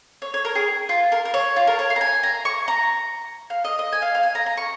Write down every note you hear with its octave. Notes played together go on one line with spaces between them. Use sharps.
C#5
C#5
A#4
G#4
F4
A#4
A#4
C#5
F4
A#4
C#5
F5
A#5
G#5
A#5
C#6
A#5
F5
D#5
D#5
G#5
F5
F5
G#5
A#5
A#5
C#6